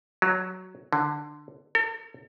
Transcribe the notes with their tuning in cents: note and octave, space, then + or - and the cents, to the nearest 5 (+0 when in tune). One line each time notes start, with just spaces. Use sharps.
F#3 +5
D3 +15
A4 +45